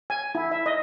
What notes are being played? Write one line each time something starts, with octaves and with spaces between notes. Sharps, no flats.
G#5
E4
E5
D#5